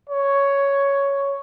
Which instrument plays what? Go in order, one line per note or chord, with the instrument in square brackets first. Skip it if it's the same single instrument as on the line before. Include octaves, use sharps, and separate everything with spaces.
[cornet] C#5